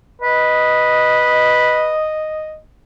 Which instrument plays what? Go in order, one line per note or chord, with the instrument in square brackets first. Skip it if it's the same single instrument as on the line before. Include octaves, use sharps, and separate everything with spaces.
[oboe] B4 [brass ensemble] D#5